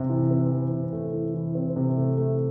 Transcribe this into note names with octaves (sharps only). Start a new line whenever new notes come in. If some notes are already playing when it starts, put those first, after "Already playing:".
Already playing: C3 C4
E3
C4
E3
C3
A3
E3
E3
C4
C3
A3
A3